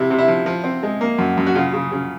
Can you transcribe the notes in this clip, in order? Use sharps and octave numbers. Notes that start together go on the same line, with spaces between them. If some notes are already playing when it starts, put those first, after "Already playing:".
Already playing: C3 E4
C3
E4
F3
F3
C4
G#3
A#3
F#2
F#2
F#4
C#3 F4
C#3
C#3